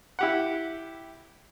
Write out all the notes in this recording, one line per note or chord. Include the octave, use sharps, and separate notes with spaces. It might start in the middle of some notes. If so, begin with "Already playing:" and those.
E4 G4 F#5